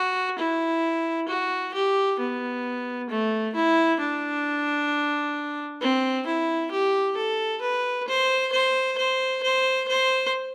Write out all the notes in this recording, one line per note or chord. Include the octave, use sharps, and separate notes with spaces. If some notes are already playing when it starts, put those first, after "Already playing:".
Already playing: F#4
E4
F#4
G4
B3
A3
E4
D4
C4
E4
G4
A4
B4
C5
C5
C5
C5
C5